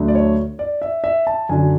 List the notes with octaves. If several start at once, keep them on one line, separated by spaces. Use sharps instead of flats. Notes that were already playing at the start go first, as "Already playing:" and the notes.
Already playing: D2 D3 F#3 A3
D5
C#5
D5
E5
E5
A5
F#2 D3 F#3 G#5